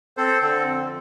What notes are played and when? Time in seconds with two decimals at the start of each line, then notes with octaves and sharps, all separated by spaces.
0.17 C4 A4 C5
0.42 D3 A4
0.66 F2